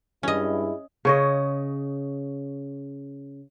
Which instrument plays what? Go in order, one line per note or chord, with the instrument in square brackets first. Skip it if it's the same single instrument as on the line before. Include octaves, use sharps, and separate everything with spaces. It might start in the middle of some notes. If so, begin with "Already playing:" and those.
[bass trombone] G2 [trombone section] G#3 E4 [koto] C#4 D#5
[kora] C#3 C#5 D#5